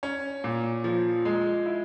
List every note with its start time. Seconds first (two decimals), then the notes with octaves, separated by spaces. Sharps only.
0.03 C#4
0.44 A#2
0.84 F3
1.25 G#3
1.66 E4